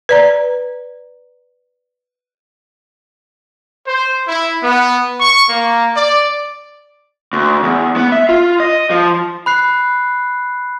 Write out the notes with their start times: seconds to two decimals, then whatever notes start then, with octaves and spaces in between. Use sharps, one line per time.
0.09 B4 D5 A#5
3.86 C5
4.26 E4
4.61 B3
5.20 C#6
5.49 A#3
5.94 D5
7.33 D2
7.63 E2
7.96 B3
8.12 E5
8.29 F4
8.60 D#5
8.90 F3
9.46 B5 F#6 C7